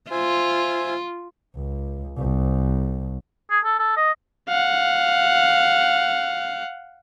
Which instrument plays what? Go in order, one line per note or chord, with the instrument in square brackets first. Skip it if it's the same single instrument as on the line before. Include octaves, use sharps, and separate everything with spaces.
[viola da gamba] F4 [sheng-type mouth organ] C5 E5 G#5
[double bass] C#2
C2
[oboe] G#4
A4
A4
D#5
[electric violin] F5 F#5